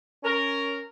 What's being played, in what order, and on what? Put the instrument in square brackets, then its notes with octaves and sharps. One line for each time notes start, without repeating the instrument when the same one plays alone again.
[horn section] C#4 A#4